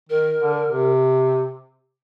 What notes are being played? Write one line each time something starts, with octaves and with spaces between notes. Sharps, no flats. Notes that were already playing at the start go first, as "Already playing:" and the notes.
D#3 A#4
D3
C3